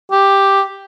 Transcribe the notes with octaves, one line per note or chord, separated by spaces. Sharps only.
G4